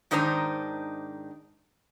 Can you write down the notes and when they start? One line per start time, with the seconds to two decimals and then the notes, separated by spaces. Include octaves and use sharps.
0.11 G#2 D#3 D4 D#4 C5 A#5